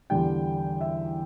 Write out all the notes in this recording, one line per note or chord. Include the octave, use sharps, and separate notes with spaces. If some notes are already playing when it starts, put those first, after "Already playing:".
E2 D3 G3 G5
E5